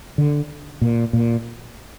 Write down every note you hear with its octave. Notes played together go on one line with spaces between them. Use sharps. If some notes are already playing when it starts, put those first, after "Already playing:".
D3
A#2
A#2